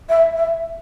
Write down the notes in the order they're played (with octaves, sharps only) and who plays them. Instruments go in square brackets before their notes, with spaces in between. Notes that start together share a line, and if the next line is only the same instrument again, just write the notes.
[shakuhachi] E5
E5